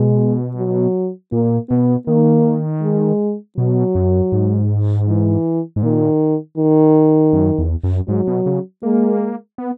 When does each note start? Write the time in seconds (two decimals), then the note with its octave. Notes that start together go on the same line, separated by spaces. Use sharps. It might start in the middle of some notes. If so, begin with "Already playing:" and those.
Already playing: B2 G#3
0.57 F#3
1.32 A#2 A#3
1.69 B2 B3
2.07 D#3 A#3
2.83 G#3
3.57 B2 F#3
3.95 F#2
4.32 G#2
5.08 E3
5.76 G#2
5.83 A#2 D#3
6.58 D#3
7.33 F#2
7.58 E2
7.83 F#2
8.08 G#2 F#3
8.27 B2
8.46 C#3
8.83 G#3 A#3
9.58 B3